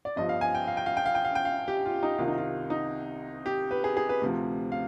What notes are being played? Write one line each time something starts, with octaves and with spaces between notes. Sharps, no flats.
D5
G1 G2 F3 D#5
F5
G#5
G5
F5
G5
F5
G5
F5
G5
F5
G5
F5
G4
F4
D#4
C2 C3 D#3 F4
D#4
F4
D#4
G4
B4
G#4
G#4
B4
D2 C3 F3
F5